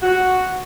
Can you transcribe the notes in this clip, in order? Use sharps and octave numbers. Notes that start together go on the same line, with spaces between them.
F#4